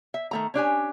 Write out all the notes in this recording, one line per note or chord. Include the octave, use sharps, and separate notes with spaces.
E5
D#3 A3 A#5
C#4 D4 G4 G#5